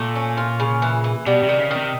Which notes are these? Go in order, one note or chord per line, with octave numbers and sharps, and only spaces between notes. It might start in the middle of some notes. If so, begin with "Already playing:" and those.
Already playing: A#2 A3
C#4
F4
C#3
E3
E3
B2 G3
C3
D#3
C#3
D#3
C3